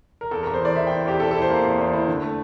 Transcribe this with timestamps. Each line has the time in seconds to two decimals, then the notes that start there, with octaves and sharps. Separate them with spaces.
0.21 A#4
0.31 E2 A4
0.43 A#4
0.47 E2
0.54 C5
0.61 E3 D5
0.75 E3 E5
0.87 G5
0.91 E4
1.05 E2 G4
1.19 E2 A4
1.31 A4
1.34 E4
1.42 C5
1.50 A#3
1.64 E2
1.78 E2
1.93 E4
2.08 D3
2.22 A3